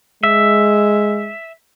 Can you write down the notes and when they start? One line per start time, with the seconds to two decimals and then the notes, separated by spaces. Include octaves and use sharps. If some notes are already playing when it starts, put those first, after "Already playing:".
0.24 G#3 E5